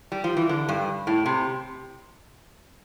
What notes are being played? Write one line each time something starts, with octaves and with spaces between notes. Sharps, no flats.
G3
F3
E3
D3
G2
A2
C3